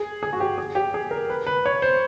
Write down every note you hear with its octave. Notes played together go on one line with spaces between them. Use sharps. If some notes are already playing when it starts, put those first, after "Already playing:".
Already playing: G#4
G#4
F#4
G4
G#4
G4
G#4
A#4
B4
B4
C#5
C5